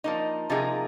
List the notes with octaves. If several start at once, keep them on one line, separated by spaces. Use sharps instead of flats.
F3 A#3 D#4
C3 F3 A#3 D#4 G#4